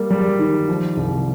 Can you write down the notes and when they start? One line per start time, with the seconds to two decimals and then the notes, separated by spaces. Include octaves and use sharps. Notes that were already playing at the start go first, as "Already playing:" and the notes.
Already playing: G3 A#3
0.10 G3
0.39 D#3
0.68 F3
0.97 C2